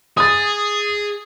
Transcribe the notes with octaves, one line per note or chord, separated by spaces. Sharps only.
G#4 D#6 A6